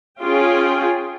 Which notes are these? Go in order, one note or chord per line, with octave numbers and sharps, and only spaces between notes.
C#4 F4 G#4 G5